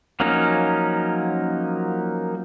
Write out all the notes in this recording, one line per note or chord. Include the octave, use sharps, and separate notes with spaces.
F3 F#3 A#3 C#4 D#4